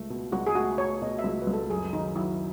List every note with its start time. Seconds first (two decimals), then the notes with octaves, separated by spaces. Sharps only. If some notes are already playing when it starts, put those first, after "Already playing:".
Already playing: C#2 A3
0.10 B2
0.32 C#2 F#4
0.47 G#4
0.55 A3 F#4
0.78 A3 C#5
1.02 B2 D#5
1.19 E5
1.24 C#2
1.42 B4
1.47 C#2
1.53 A4
1.70 F#2 G#4
1.93 D#3 D#4
2.16 F#3 E4